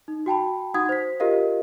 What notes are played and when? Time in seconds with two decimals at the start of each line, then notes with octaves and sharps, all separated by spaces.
0.08 D#4
0.26 F#4 G5 A5 B5
0.74 D#4 F#4 F#5 D#6 G#6
0.89 C5 B6
1.20 F4 G4 A#4 D#5 F5